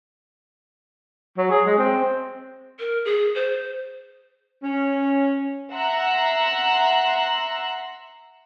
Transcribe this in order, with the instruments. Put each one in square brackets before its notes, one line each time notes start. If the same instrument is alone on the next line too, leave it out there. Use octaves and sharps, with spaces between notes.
[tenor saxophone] F#3
G#4
G#3
C4
[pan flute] A#4
G#4
C5
[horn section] C#4
[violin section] E5 F#5 A#5 C6 E6 F#6